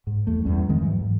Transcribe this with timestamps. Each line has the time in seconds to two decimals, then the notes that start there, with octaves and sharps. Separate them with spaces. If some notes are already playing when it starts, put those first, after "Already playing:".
0.07 G#2
0.27 E2 A3
0.44 E2 G2 C#4
0.69 E2 D#3 G#3 C4
0.81 G#2 E3 F#3
1.01 G#2